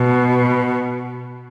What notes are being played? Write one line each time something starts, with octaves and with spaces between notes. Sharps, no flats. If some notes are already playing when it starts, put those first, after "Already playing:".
Already playing: B2